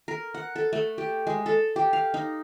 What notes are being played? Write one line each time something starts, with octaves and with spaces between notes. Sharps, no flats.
A#4
F#5
A4
A3
G4
G#3
A4
G4
F5
D#4